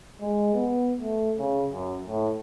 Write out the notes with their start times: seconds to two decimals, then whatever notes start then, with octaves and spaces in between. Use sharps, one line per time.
0.20 G#3
0.54 B3
1.00 A3
1.38 C#3
1.70 F#2
2.07 A2